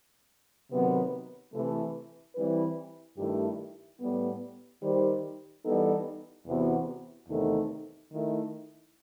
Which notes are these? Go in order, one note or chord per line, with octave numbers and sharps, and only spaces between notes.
C3 D#3 F#3 B3
C3 E3 A3
E3 G3 C4 E4 B4
G2 D#3 A3 E4 G4
A2 G3 B3
D#3 G3 D#4 G4 C5
E3 G3 B3 D#4 A4
E2 C3 E3 B3 F#4
E2 C3 D#3 A3 D#4
D#3 A3 E4